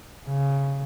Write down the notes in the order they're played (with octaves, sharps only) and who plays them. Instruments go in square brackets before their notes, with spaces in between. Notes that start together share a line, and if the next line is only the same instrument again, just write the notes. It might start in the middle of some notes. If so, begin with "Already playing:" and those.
[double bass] C#3